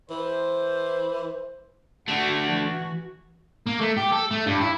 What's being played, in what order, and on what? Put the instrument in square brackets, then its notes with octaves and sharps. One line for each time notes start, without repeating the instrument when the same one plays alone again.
[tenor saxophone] E3 [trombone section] C5
[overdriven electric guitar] D3 A3 [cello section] F#4
[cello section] E3 F#4
[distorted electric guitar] A#3
A3
G4
A4
A3
G2
E4